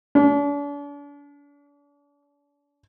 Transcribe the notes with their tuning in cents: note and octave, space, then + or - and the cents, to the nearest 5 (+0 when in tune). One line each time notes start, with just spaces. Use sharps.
D4 -40